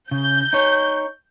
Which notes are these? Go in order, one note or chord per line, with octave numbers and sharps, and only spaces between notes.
C#3 G6
D#4 C#5